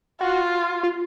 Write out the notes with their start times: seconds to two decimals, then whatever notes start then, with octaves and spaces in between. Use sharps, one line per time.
0.21 F4 F#4
0.83 F4